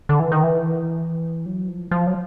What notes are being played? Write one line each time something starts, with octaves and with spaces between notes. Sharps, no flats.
D3
E3
D#3
E3
F#3
F3
F3
F#3